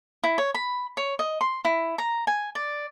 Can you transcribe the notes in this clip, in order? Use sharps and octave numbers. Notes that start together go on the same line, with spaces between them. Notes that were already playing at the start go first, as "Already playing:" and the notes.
E4
C#5
B5
C#5
D#5
C6
E4
A#5
G#5
D5